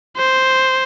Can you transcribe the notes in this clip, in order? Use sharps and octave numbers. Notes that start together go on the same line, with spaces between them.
C5